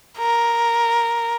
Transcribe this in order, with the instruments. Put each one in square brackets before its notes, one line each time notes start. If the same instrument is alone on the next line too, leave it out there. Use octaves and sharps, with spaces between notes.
[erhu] A#4